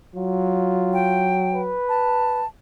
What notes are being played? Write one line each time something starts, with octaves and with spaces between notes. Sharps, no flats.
F#3 F4
G5
B4
A5